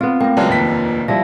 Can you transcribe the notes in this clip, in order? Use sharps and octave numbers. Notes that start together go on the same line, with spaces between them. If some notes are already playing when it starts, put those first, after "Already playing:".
B3 C4 F4
A3 A#3 G5
C#3 F#3 G#3 D4 F4 B4
F1 D#2 B6
F3 G3 E4 A#6